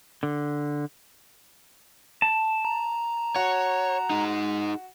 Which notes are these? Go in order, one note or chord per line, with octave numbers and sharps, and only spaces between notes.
D3
A5
A#5
F#4 C#5
D#4 G#4